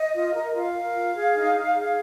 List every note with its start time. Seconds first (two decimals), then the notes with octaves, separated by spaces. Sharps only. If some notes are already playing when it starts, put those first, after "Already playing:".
Already playing: D#5
0.13 F4
0.34 A#4
0.53 F4 F5
0.73 A#4
0.95 F4
1.15 G#4
1.34 D#4
1.54 D#4
1.74 G#4